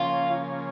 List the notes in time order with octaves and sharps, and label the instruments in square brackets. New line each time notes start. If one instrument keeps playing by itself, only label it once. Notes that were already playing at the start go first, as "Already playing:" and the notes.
Already playing: [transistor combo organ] C#3 F3 A#3 C#4 [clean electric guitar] F4